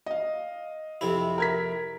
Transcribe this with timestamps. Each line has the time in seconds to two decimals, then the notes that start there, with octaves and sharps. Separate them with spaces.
0.06 D#5 F5
1.01 F2 C3 E4
1.38 A#4 G#6 B6